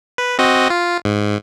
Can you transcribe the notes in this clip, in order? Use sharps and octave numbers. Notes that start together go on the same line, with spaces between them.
B4
C4 F#4 D#5
F4
G#2